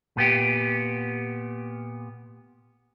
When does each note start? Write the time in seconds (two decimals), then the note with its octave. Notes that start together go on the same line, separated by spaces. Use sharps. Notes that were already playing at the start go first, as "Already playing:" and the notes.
0.17 A#2 B3 G4